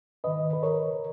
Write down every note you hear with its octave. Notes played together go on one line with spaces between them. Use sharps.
G#2 D#3 B4 D#5
B4
A#4 C#5